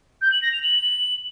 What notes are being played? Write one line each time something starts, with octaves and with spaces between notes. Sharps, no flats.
G6
F#7
A#6
F7
F#7